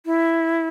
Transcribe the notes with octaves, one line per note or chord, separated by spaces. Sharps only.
E4